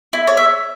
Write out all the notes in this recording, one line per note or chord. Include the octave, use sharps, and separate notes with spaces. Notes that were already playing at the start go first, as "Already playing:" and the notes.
E4
C#5
E5